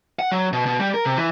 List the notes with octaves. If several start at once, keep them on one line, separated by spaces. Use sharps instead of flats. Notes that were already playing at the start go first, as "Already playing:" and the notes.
F#5
F#3
B2
B2
G3
A#4
C3
E3